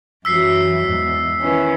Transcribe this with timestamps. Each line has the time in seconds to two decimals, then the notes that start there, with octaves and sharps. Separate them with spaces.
0.25 F#2 E3 F#3 E6 B6 C7
0.84 E2 G#2
1.41 D#3 E3 C#4